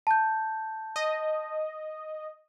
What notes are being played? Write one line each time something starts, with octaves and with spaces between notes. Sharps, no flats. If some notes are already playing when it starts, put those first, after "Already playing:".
A5 G6
D#5